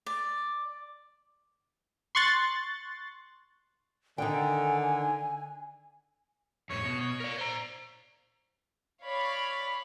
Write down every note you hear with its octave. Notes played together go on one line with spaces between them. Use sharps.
D5
C6 C#6 F#6 A6
D3 D#3 G5 G#5
F2 A2 C#5
B2
C#5
A#4 D5
C5 A#5
C#5 D5 F5 B5